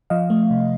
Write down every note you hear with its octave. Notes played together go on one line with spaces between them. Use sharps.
F3 D#5 F5
A3
C3